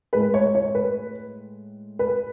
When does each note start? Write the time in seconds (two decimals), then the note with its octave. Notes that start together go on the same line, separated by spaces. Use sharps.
0.13 A2 G#3 B4
0.34 C#5
0.55 C#5
0.75 B4
1.99 B4